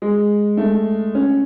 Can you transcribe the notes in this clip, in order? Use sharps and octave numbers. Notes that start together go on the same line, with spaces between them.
G#3
A3
C#4